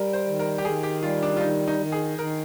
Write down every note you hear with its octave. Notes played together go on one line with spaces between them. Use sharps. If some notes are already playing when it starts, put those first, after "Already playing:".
Already playing: G3 A#4
C5
D#3
A#4
G4
D#3 G#4
G4
G3 F4
D4
F4
D#3 D#4
D#4
D#3
G#4
D#3 A#4